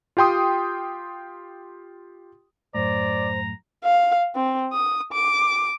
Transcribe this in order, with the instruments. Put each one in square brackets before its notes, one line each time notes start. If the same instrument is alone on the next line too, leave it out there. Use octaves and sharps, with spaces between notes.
[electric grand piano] F4 G4 G5 C6 D#6
[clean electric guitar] F#2 A2 [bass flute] C5 [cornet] D5 [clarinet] A#5
[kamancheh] F5
C4
D#6
D6